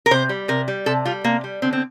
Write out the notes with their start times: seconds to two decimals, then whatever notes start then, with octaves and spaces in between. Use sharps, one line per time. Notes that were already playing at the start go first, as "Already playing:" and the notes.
0.06 A#4
0.11 C3 C5
0.29 G3
0.48 C3 A#4
0.68 G3
0.86 C3 A4
1.05 G3 F4
1.24 C3 A#3
1.44 G3
1.62 D3 C4
1.73 C4